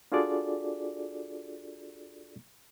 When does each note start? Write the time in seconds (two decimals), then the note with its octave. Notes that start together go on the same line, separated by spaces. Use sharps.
0.12 D4 F4 F#4 G#4 A4 D5